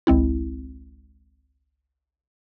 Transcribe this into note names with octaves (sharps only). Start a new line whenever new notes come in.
G#1 C#2 G#3 C4 E4